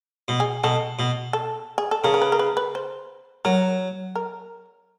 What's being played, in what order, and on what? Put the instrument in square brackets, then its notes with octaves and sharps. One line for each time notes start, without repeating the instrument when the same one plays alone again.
[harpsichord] B2
[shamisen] G#4
[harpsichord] B2 [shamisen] A4
[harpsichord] B2
[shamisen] A4
G#4
A4
[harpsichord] C#3 [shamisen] A#4
[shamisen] A#4
B4
A#4
B4
B4
C5
[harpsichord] F#3 [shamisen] A#4
[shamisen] A#4